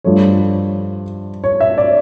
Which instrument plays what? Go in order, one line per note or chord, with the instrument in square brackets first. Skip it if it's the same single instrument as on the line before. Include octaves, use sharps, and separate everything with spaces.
[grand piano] G2 F3 A3 C#5
C#5
E5
D5